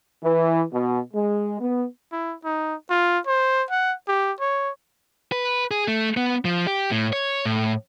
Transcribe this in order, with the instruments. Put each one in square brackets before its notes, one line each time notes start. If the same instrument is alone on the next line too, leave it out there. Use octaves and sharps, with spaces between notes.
[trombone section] E3
B2
G#3
B3
[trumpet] E4
D#4
F4
C5
F#5
G4
C#5
[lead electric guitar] B4
G#4
A3
B3
F3
G4
A2
C#5
A2